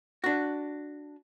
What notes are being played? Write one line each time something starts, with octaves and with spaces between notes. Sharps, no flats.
D4 F#4